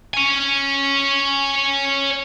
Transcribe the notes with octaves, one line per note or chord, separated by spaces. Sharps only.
C#5 G#5